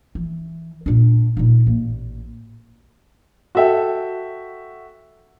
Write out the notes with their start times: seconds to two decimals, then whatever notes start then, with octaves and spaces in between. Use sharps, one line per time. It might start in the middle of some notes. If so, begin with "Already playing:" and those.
0.15 E3
0.86 A#2 D4
1.37 A#2 D#4
1.67 A1 A#3
3.55 F#4 A4 E5 G5